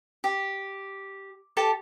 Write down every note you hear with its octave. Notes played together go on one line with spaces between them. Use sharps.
G4
G4 A4 A5